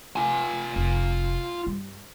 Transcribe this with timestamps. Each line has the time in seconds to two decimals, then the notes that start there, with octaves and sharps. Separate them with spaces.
0.16 F4 G#5
0.76 F1
1.67 G2 G3